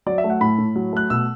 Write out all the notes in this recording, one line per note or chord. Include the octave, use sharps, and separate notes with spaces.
F#3 D5
E5
A3
F#5
A2 B5
A2
F#3
A3 F#6
B2 E6